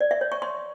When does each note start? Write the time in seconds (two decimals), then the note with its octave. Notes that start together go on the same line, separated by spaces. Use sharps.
0.01 D5
0.11 E5
0.21 C#5
0.32 C#6
0.42 C6